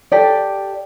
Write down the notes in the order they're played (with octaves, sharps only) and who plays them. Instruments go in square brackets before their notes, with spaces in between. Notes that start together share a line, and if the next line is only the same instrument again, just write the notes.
[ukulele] G4 A4 D5